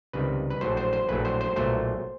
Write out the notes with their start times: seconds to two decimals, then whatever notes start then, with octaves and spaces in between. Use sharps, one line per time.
0.13 C#2 C3 D#3 G3 B4
0.50 B4
0.61 A#1 A2 F#3 C5
0.77 C5
0.93 C5
1.09 A#1 A2 F#3 B4
1.25 C5
1.41 C5
1.56 B1 A#2 F#3 A3 C5